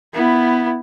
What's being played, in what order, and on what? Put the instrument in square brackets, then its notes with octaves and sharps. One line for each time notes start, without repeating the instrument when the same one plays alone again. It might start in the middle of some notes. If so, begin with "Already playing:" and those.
[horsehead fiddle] B3 E4